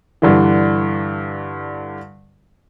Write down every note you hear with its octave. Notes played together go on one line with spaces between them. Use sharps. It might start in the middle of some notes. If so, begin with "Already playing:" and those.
G2 D3 E3